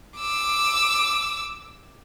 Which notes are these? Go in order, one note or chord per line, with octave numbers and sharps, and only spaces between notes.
D6 E6